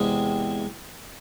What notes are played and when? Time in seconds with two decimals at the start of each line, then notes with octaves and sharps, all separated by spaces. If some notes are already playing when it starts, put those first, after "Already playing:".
Already playing: E2 C3 G#3